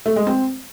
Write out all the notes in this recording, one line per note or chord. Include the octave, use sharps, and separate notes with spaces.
A3
G#3
C4